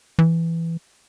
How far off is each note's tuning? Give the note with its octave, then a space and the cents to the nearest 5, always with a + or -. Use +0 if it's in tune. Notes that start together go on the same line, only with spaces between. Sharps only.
E3 +10